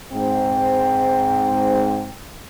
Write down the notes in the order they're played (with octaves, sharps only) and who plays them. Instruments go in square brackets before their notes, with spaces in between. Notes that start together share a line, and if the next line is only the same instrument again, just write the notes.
[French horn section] G#2 C4 [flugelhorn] G5